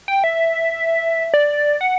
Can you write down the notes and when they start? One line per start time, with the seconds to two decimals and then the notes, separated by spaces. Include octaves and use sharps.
0.08 G5
0.24 E5
1.34 D5
1.81 F#5